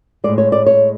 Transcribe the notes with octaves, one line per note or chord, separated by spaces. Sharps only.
A2 G#3 D5
C#5
D5
C#5